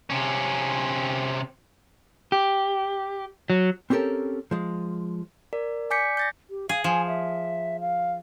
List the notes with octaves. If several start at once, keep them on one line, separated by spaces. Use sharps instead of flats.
C3 C#4
G4
F#3
C4 C#4 G4 A4 A#4
F3 G#3
A#4 D5
D5 G#5 D6 G6 B6 C#7
G6 A6 A#6
G4
G#4 F5
F3 G#5
E5
F5